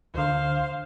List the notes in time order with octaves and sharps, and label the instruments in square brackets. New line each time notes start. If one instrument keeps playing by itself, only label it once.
[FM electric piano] D2 D3 [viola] C5 F5